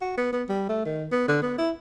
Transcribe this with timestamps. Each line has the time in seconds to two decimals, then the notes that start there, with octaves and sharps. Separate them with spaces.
0.02 F#4
0.18 B3
0.33 B3
0.49 G3
0.69 A3
0.85 D#3
1.12 B3
1.28 D3
1.42 B3
1.58 E4